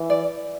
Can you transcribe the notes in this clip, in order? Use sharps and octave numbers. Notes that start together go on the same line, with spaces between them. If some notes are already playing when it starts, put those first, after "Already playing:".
Already playing: E3
D5